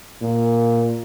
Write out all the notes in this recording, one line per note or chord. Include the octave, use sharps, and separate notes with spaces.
A#2